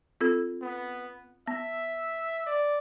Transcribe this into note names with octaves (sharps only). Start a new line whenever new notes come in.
C4 F4 A4
B3
B3 E5
D5